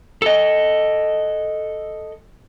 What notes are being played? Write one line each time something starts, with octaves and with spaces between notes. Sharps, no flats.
A4 D#5